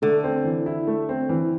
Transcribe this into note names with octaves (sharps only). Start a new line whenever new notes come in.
D3 A3
C4
E3
E4
A3
C4
E3